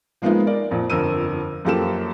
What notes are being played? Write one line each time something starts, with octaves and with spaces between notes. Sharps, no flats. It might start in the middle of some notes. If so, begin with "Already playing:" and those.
F3 G#3 A#3 B3 D#4 F4
A#4 D5
F2 A#2
G1 F2 A#4 E6 D#7
F#2 F3 A#3 G4 A4 E7